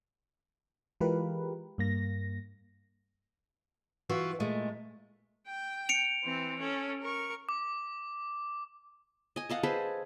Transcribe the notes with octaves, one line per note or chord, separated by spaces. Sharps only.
E3 G#3 F4 G4 A#4 B4
G2 A#3 A#6
E3 F4 F#4
A#2 G#3 A3
G5
C#7 D7 F7
E3 C4
C#4 A4
A#4 C#6
D6
D#5 G#5
A4 D#5 F5 F#5
G#4 A4 B4 C5